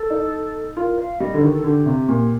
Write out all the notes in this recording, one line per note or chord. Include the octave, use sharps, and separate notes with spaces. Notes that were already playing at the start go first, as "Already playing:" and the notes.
Already playing: A4
D#4
F4 A#4
F5
G3 D#5
D3
D#3 G4
A4
D3 G4
C3
A#2